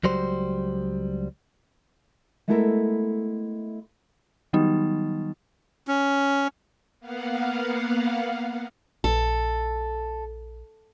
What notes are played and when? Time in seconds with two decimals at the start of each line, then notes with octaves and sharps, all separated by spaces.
0.04 C#2 F#3 G3 C5
2.48 G#3 A3 B3 E4 A4 A#4
4.53 D#3 F#3 G3 B3 D#4
5.88 C#4
7.00 A#3 B3 F5 F#5
9.04 A#1 A4